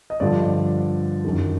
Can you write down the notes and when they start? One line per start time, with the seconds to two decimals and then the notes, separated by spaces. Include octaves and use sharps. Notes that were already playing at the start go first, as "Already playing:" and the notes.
0.10 D#5
0.20 G2 D3 F3 D5
1.25 F#2 D#3